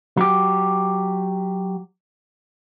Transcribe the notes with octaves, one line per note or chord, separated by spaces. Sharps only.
F#3 G4